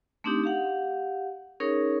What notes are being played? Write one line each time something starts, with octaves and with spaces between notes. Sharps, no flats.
A3 C4 D4 D#4 G4
G4 F5 F#5
C#4 D#4 G#4 A#4 C#5